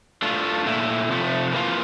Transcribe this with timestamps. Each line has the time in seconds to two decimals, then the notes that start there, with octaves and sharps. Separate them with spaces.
0.22 A3 D4 F4
0.66 A#2 A3 E4
1.09 C3 F3 A3
1.52 E3 A#3 F4